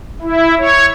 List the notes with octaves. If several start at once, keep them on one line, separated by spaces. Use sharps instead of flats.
E4
C#5